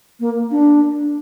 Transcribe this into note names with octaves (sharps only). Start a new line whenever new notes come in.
A#3
D4